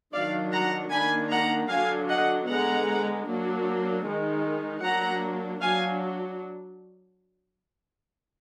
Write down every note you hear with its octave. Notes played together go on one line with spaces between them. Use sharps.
D#3 F#3 D4 D5 F5
F#5 A#5
D#3 A#3 D4 G#5 B5
F#5 A#5
D3 F#3 D4 F5 G#5
D#5 F#5
D3 G#3 B3 F#5 A#5
F#3 A#3 D4
D#3 G#3 D#4
F#3 A#3 D4 F#5 A#5
F#3 D4 F5 G#5